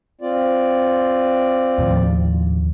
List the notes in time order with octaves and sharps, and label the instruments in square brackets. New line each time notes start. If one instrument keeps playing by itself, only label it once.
[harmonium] C4 F4 D5
[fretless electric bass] D#2 A2 F3